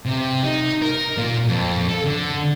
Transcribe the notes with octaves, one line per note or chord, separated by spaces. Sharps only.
C3
D#4
A#4
A#2
F2
A4
D3